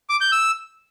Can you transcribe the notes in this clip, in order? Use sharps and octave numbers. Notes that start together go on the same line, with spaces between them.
D6
G6
E6